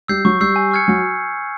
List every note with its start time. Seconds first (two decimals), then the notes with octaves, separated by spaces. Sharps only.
0.08 G3 G4 E6 G6 C7
0.25 F#3 F#4 C#6
0.40 G3 G4 E6 G6 C7
0.56 G#5
0.71 C#6 F6 G#6 C#7
0.87 F#3 F#4 G#5